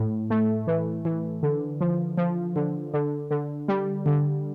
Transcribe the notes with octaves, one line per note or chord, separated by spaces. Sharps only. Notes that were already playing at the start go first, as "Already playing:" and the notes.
Already playing: A2
A3
E3
E3
D3
F3
F3
D3
D3
D3
G3
D3